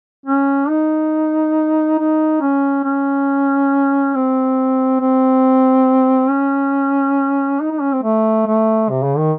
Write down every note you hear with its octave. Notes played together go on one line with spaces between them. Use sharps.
C#4
D#4
D#4
C#4
C#4
C4
C4
C#4
D#4
D#4
C#4
C4
A3
A3
C3
C#3
D#3